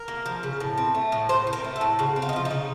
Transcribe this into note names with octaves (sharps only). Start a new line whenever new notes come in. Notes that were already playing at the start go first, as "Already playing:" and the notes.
Already playing: A#4
A#3
F3
C#3
A2
C4
A3
A2
A2 C5
C4
A#4
A3
A4
A2
C#3 F#4
C4
F4
D#4
F3 F4
D#4
C#3